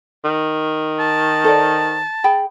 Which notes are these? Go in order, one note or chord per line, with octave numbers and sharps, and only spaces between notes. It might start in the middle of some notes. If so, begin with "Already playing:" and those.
D#3
A5
A4 C5 D5
G#4 G5 B5